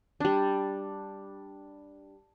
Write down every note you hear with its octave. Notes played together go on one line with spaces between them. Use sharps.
G3 D4